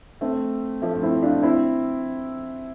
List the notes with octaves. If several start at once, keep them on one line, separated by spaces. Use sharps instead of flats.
A3 C4
F3 A3
C4 E4
D4 F4
C4 E4